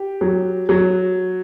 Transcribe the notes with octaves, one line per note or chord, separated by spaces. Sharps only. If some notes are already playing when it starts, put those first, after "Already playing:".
Already playing: G4
F#3
F#3